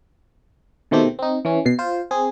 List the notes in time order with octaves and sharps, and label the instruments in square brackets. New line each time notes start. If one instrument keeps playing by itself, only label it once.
[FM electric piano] B2 D#3 A3 C4 G4
C4 D#4
E3 C#4
B2 C7
F4 C5
C4 G#4